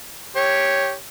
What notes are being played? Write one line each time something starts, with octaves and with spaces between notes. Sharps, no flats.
G4 C#5